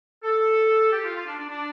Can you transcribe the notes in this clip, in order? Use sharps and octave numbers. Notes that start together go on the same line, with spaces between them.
A4
G4
F4
F4
D4
D4
D4